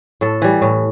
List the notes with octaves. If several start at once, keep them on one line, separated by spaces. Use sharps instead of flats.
A2 A4
E3 G3
A2